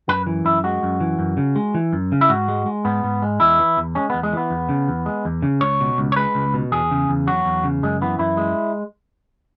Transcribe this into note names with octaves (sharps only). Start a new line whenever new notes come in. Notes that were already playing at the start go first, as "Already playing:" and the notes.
F#2 B4
E3
F#2 E4
G#3 F#4
F#2
E3
F#2
C#3
G#3
E3
F#2
C#3
E4
G#2 F#4
G#3
G#3
G#2 B3
G#2
G#3
E2 E4
E3
E2
G#3 C#4
E2 B3
G#3
E3 B3
E2
C#3
E2
G#3
E2
C#3
C#2 C#5
B2
C#2
C#5
G#3 B4
C#2
B2
E2 G#4
C#3
E2
F#3 F#4
E2
C#3
F#2 G#3
E3 B3
F#2 E4
G#3